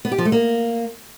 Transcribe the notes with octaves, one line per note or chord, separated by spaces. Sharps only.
B3
G4
F3
A3
A#3